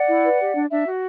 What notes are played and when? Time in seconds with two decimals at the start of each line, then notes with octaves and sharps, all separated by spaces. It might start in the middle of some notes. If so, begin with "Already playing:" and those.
Already playing: D5 F#5
0.08 E4
0.25 B4
0.40 G4
0.56 D4
0.71 D4 E5
0.87 F#4